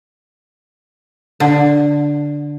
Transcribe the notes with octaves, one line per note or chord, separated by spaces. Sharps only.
D3